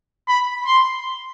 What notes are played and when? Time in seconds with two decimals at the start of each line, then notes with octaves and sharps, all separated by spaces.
0.28 B5
0.66 C6